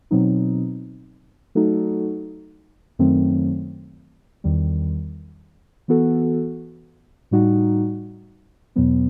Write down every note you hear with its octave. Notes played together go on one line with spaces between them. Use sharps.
B2 F#3 C4 D#4
F#3 A3 D#4 F#4 A4
F#2 D#3 F#3 A3 C4
E2 D#3 G3
E3 B3 F#4 A4
A2 G3 D#4 F#4
E2 B2 F#3 B3